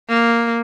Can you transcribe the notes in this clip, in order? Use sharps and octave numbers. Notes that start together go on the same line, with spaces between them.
A#3